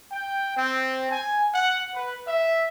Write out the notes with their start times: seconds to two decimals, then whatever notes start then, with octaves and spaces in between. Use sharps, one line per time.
0.11 G5
0.57 C4
1.12 G#5
1.55 F#5
1.96 B4
2.27 E5